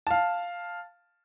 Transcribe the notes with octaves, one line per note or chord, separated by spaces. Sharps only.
F5 A5